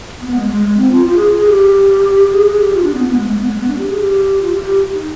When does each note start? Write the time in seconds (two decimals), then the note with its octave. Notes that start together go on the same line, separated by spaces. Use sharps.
0.21 B3
0.36 G#3
0.49 G#3
0.63 G#3
0.77 C4
0.91 F4
1.06 F4
1.16 G#4
1.37 G#4
1.47 G4
2.31 G#4
2.45 G#4
2.59 G4
2.74 F4
2.84 D4
2.94 B3
3.05 B3
3.15 G#3
3.26 G#3
3.36 B3
3.47 G#3
3.57 B3
3.67 D4
3.78 G4
3.89 G#4
3.99 G4
4.41 F4
4.52 G4
4.62 G4
4.94 D#4